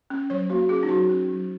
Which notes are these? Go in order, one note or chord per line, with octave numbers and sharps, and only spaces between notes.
C#4
F#3 C#5
A#3 F#4
C#4 G#4
D#4
F#3 F#4
C#4
F#3